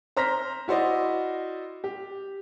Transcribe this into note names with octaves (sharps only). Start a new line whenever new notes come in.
C5 A#5 F6 A#6 B6
E4 F#4 C5 D5 D#5
G4